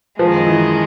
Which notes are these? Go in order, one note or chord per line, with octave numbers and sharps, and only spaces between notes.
F#2 D#3 F3 G#3
E3